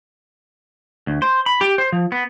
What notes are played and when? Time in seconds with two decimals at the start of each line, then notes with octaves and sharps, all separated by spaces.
1.07 D2
1.22 C5
1.46 B5
1.61 G4
1.78 C5
1.92 F3
2.12 B3